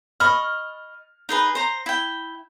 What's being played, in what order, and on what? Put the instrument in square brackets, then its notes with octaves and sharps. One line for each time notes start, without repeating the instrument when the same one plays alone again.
[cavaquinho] D#5 B5 C#6 [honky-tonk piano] F6
[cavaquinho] D#4 G#4 B4
C5 A#5
E4 G5